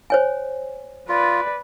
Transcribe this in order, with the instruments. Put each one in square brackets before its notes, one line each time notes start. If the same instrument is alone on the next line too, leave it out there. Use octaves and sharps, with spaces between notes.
[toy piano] C5 C#5 G#5
[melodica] F4 [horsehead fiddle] B4 D5